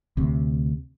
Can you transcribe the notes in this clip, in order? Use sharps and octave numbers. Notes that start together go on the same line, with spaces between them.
D2 C3